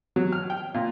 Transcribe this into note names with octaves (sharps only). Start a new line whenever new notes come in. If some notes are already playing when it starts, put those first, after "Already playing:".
F#3
F6
G5
A#2